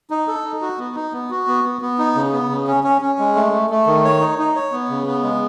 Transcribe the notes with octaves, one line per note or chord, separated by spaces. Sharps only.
D#4
A4
D#4
F#4
B3
D#4
B3
F#4
B3
B3
B3
D#4
C#3
B3
C#3
C#4
C#4
C#4
G#3
A3
A3
A3
D#3
C#5
D#4
D#4
C#5
B3
C#3
B3
G#3